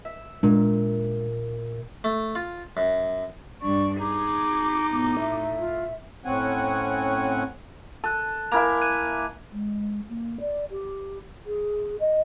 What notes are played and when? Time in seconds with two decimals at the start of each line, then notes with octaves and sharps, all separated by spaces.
0.05 E5
0.43 A#2 G#3 D4
2.04 A3
2.35 F4
2.77 F#2
3.61 G2 D4 C#6
4.00 D#4 G#4 D6
4.90 A2 B3
5.19 E5
5.59 F4
6.25 A2 C4 C#4 F#5 G#5
8.04 A4 A5 F#6
8.52 A#3 E4 E5 G#5 G#6 F7
8.81 F#6 G#6 D#7
9.52 G#3
10.09 A#3
10.40 D5
10.70 G4
11.46 G#4
12.00 D#5